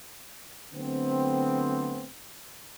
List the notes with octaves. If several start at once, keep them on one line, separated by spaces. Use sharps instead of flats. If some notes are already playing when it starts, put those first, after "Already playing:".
D3 F#3 A3 B3 C4